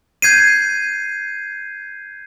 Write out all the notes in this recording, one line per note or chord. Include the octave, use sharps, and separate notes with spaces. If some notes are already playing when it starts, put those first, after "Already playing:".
G6 G#6 C7 D#7